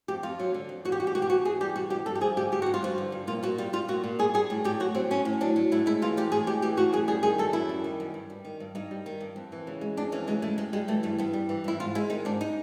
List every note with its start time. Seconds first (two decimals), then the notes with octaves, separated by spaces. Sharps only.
0.08 F2 G4
0.23 F2 F4
0.39 F#3
0.54 D3
0.69 F2
0.85 E2 F#4
0.92 G4
1.00 G3 F#4
1.07 G4
1.15 B2 F#4
1.22 G4
1.30 E2 F#4
1.45 E2 G#4
1.61 G3 G4
1.76 B2 F#4
1.90 E2 G4
2.06 G2 A4
2.15 G4
2.21 F3 G#4
2.37 D3 G4
2.52 G2 G4
2.62 G2 F#4
2.74 F4
2.83 F3 F#4
2.98 D3
3.12 G2
3.27 A#2 F4
3.43 A#2 F#4
3.58 G3 F4
3.73 G3 F4
3.88 A#2 F#4
4.04 A#2
4.19 G3 G#4
4.34 G3 G#4
4.50 A2
4.64 A2 G4
4.80 F#3 F#4
4.95 F#3 C4
5.11 A2 C#4
5.25 A2
5.41 F#3 D4
5.56 F#3
5.71 A2 E4
5.86 G#3 E4
6.02 E3 F4
6.17 A2 G4
6.32 A2 G#4
6.47 G#3 G4
6.62 E3 G4
6.77 A2 F#4
6.93 F#2 G#4
7.08 G3 G#4
7.23 D#3 G#4
7.38 F#2 A4
7.53 F#2 E4
7.69 G3
7.84 D#3
8.00 F#2
8.14 G2
8.30 G3
8.45 D#3
8.60 G2
8.75 G2 D#4
8.91 G3
9.06 D#3
9.21 G2
9.36 F2
9.52 E3
9.67 C#3
9.81 G#3
9.97 F2 D4
10.12 E3 C#4
10.27 C#3 G#3
10.42 G#3 A3
10.58 G2 G#3
10.73 G3 G#3
10.88 E3 A3
11.03 G2 A3
11.18 G2 B3
11.33 G3
11.49 E3
11.64 G2 E4
11.80 G#2 F4
11.95 G#3 E4
12.10 D#3 D#4
12.25 G#2 D4
12.41 D#4